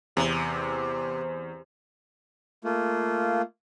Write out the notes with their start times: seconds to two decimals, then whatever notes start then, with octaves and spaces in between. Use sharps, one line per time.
0.17 E2 C3
2.64 A3 A#3 F4